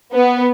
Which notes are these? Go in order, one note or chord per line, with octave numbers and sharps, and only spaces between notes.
B3